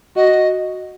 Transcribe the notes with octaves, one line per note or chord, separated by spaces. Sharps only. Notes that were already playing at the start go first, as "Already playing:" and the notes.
F#4 D#5